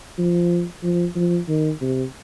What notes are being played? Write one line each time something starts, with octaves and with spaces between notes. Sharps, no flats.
F3
F3
F3
D#3
C3